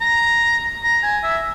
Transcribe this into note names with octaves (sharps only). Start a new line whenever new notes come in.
A#5
A#5
G#5
E5